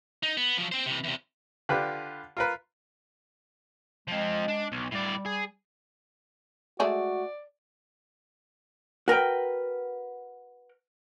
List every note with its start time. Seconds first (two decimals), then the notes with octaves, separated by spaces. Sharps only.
0.23 D#4
0.37 B3
0.58 F3 F#3
0.72 C4 C5
0.86 C3 E3
1.04 E2 C3
1.69 D3 F4 G4 B4
2.37 F4 A#4 B4
4.08 F3 G#3 C4
4.48 D4
4.72 B1
4.91 A2 G3 D5
5.25 G#4
6.80 G#3 A3 F#4 G#4 D5
9.08 F#4 A#4 B4 G5